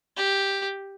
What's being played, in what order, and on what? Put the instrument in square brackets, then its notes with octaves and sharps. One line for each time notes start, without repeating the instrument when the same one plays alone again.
[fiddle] G4